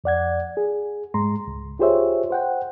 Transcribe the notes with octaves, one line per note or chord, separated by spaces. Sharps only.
F2 D5 F#5 G#6
G#4
G#2 G#3 A#5 C6
C#2
F4 G4 G#4 C5 C#5 E5
C5 F#5 G5